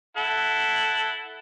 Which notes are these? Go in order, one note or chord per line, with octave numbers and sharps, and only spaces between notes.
E4 A4 F#5